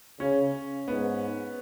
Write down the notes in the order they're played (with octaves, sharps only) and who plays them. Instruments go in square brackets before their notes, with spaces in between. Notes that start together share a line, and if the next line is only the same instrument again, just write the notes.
[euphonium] C#3 [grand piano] C#4
[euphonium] G#2 [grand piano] B3